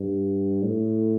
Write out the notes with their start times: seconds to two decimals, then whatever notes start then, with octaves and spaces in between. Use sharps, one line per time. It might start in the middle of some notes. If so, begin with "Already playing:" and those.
Already playing: G2
0.63 A2